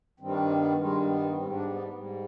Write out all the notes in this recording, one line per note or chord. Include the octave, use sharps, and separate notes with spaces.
G2 D#3 G3 C4
D4
C4
B3
B3
G2 D#3 G3 G#3
B3
G#2 G3 C4
D4
B3
G#2 G3